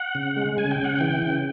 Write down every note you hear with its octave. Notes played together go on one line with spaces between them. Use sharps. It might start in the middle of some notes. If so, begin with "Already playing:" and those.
Already playing: F#5
C#3
G#3
C#3 G#5
G5
C#3 F#5
E3 G5
C#3